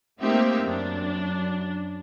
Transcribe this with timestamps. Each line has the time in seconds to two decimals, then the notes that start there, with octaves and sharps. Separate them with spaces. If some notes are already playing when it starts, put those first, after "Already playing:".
0.21 A3 A#3 C4 D#4 G4 E5
0.63 F#2 D4